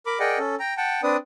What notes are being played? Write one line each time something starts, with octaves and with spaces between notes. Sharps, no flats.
A#4 B5 D6
G#4 A#4 D5 D#5 F#5 G5
C#4 A4
G5 A#5
F#5 G5 A5
C4 D4 B4 D5 D#6